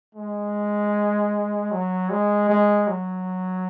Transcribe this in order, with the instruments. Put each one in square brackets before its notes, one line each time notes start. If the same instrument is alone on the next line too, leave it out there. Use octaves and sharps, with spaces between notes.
[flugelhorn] G#3
F#3
G#3
G#3
F#3